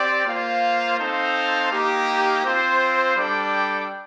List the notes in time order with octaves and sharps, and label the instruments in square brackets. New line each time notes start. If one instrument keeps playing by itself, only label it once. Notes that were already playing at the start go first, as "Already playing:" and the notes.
Already playing: [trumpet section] C4 G4 D5
A#3 F4 C5 F5
C4 D#4 A4 C5 F5
A#3 D#4 G4
C4 F4 C5
G3 D4 A4 D5 G5